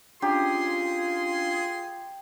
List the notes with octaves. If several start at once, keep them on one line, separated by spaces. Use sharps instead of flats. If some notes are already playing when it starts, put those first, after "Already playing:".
C#4 D4 F4 G4 G#4 A#5 C6